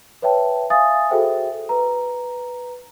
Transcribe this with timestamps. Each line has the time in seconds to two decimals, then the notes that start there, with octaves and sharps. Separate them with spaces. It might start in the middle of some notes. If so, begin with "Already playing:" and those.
0.22 B4 C#5 E5 G5 A5
0.70 E5 F5 G#5 D#6 A6
1.09 F#4 G#4 A4 C5 E5 G5
1.69 B4 A#5